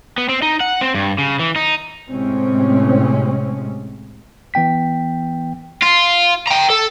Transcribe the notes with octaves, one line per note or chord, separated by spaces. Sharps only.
B3
C4
D#4
F#5
C4
G2
C#3
E3
D#4
A2 C3 G#3 C4 C#4
E3 B3 G5 B6
F4
G5 A#5
A4